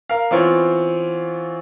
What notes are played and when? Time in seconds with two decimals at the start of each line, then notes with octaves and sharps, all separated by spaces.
0.09 A#4 F5
0.31 E3 B3 C4 F4 C#5